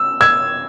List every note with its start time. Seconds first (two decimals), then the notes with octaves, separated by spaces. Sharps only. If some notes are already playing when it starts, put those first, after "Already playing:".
Already playing: E6
0.21 E6 G#6